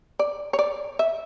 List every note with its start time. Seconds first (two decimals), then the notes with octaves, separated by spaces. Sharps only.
0.19 D5
0.53 C#5
0.59 D5
0.99 E5